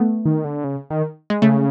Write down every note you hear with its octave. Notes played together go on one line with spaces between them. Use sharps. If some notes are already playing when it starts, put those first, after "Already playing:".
Already playing: A3 B3
D#3
D3
C#3
D#3
G#3
C#3 A3